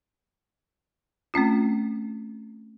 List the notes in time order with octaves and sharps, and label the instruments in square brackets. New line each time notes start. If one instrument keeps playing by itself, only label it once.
[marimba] A3 C4 C#4 F4